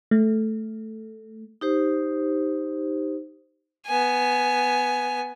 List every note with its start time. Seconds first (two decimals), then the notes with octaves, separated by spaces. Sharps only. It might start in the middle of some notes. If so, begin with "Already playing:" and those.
0.11 A3
1.61 D#4 G4 C5
3.86 B3 G#5